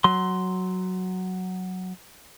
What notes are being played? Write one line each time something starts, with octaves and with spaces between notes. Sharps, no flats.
F#3 C6